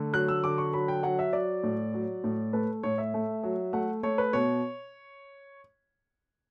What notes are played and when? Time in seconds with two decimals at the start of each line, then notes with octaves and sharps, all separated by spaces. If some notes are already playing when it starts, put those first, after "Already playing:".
Already playing: D3 A3
0.13 F#3 F#6
0.28 E6
0.44 D3 D6
0.58 C#6
0.73 F#3 B5
0.88 G5
1.03 F#3 F#5
1.19 E5
1.33 F#3 D5
1.63 A2
1.93 F#3
2.24 A2
2.53 A3 B4
2.83 A2 C#5
2.98 E5
3.14 A3
3.43 F#3
3.73 A3 F#5
4.03 A3 C#5
4.18 B4
4.33 B2 C#5